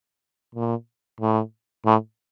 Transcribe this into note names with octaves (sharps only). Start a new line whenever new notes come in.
A#2
A2
A2